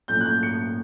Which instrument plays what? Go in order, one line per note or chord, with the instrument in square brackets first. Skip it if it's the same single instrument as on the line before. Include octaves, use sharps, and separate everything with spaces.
[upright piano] A#2 F#3 A3 C#4 E4 [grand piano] G6
[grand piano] F#6
G6
C#7